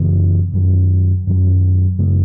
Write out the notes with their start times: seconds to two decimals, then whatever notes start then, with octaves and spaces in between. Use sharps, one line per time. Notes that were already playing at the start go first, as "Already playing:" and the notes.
Already playing: F#2 C#3 E3 B3
0.53 F#2 D#3 F#3
1.27 F#2 D#3 F#3
1.98 F#2 C#3 G#3 B3